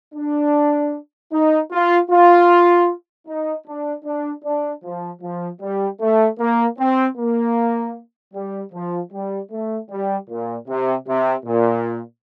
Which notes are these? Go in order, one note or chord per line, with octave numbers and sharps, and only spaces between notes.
D4
D#4
F4
F4
D#4
D4
D4
D4
F3
F3
G3
A3
A#3
C4
A#3
G3
F3
G3
A3
G3
A#2
C3
C3
A#2